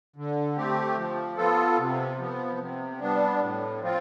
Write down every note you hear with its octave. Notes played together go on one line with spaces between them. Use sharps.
D3
A3 C4 G4
F3
B3 F4 A4
C3
F3 B3
C3
G3 B3 D4
A2
F3 C4 F4